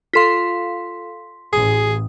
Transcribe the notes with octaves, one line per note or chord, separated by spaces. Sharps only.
F4 A4 F5 C6 B6
A1 G#4 D#6